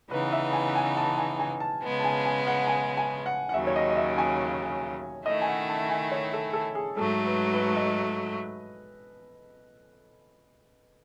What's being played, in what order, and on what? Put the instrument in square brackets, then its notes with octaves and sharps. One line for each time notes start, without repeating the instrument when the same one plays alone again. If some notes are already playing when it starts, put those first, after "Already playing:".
[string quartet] C#3 E3 B3 D#4 [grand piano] B4
[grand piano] E5
G#5
G#5
A5
G#5
G#5
A5
[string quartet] C#3 G#3 B3
[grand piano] A5
G#5
G#5
F#5
G#5
G#5
F#5
F#5
[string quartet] D#2 C#3 F#3 [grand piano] E5
[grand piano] C#5
D#5
D#5
E5
G#5
[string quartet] D#3 A3 E4 [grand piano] D#5
[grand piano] G#5
F#5
A5
G#5
C#5
A4
A4
G#4
[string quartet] G#2 F#3 A3 [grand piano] A4
[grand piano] B4
B4
D#5